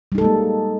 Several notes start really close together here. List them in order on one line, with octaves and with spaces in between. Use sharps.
G3 D#4 A4 G#3 A#3